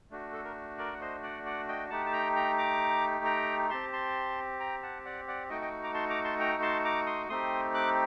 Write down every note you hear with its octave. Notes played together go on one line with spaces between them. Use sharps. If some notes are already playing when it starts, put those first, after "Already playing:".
A3 D4 F#4
A4
A#4
A#4 D5
F#5
C5 D#5
D5 F#5
D5 F#5
D#5 G5
A3 D#4 G4 F#5 A5
A5
G5 A#5
G5 A#5
A#5 D6
G5 A#5
C4 G4 A5 C6
A5 C6
G5 A#5
F#5 A5
D5 F#5
D5 F#5
A3 D#4 F#4 D#5 G5
D#5 G5
A#5 D6
A5 C6
A#5 D6
A5 C6
G5 A#5
A5 C6
A#5 D6
C6 D#6
A3 C4 D#4 G4 C6 D#6
D6 F#6